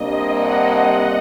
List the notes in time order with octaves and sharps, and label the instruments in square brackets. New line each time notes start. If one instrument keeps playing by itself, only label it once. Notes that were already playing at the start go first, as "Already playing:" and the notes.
Already playing: [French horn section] C3 G3 A#3 D4 [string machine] D#5
[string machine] F#5